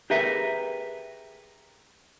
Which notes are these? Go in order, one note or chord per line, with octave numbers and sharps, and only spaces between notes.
G4 G#4 A#4 B4 E5